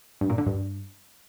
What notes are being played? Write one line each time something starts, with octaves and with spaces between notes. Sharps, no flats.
G2
A#2
D3
G2